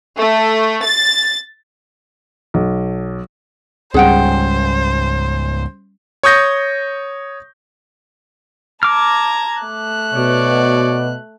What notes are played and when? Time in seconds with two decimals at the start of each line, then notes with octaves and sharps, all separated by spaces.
0.19 A3
0.84 A6
2.54 B1
3.94 C#2 G#2 G3 C#4 G#4 C5 F#5 G5
6.23 C#5 C#6 D#6 G6 A#6
8.83 A5 A#5 D6 F6 G#6
9.62 A3 F#6
10.14 B2 C#5 D5